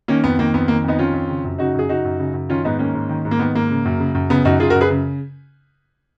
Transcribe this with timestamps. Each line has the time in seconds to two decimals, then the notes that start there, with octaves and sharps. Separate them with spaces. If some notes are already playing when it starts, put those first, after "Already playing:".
0.08 D#3 A#3 C#4
0.24 F2 B3
0.39 D#3 A#3
0.54 F2 B3
0.68 D#3 A#3
0.84 F2 B3 D#4
0.99 D#3 C#4 F4
1.13 F2
1.29 C#3
1.45 F#2
1.58 C#3 D#4 F#4
1.74 F#2 G#4
1.89 C#3 D#4 F#4
2.05 F#2
2.19 C#3
2.34 F#2
2.49 D#3 C#4 F4
2.65 G#2 B3 D#4
2.79 D#3 A#3 C#4
2.94 G#2
3.09 D#3
3.25 G#2
3.31 A#3
3.39 D#3 B3
3.55 G#2 A#3
3.71 C#3
3.85 F#2
4.00 C#3
4.15 F#2
4.30 C#3 B3
4.45 F#2 D#4 F#4
4.60 C#3 F4 G#4
4.70 F#4 A#4
4.75 F#2
4.81 G#4 B4
4.90 C#3